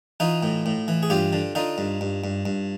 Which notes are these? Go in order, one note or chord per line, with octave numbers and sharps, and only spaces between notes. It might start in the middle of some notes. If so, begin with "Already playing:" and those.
E3 D#4 F4
A2
A2
E3
G#4
G2 F4 G4
D3
D3 D#4 F4
G2
G2
G2
G2